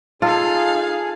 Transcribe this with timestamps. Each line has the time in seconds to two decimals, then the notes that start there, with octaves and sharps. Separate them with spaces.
0.22 D#4 F4 G#4 A4 F5